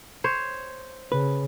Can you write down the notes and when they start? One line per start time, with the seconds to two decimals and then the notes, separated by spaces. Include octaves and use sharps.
0.24 C5 C#5
1.12 C#3 B4